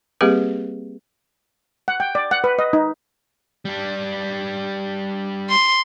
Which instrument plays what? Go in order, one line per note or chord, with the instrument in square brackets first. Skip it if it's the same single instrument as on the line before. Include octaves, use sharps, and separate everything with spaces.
[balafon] G3 A#3 C4 G4 G#4 B4
[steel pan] F#5
G5
D5
F#5
B4
D#5
D#4
[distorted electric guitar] G3 D4
[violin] C6